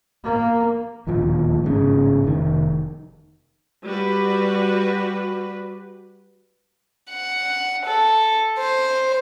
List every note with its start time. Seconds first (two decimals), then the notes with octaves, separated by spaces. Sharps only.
0.24 A#3
1.07 D1 D#2 A#2 F3
1.64 A1 G#2 C#3
2.24 F1 D#3
3.84 G3 F#4 B4
7.11 F#5
7.86 A4
8.59 C5